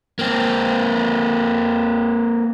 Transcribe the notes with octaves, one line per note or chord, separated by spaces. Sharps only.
A#3 C4